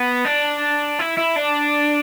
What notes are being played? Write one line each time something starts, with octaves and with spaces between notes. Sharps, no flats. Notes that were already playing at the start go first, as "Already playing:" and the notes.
Already playing: B3
D4
E4
E4
D4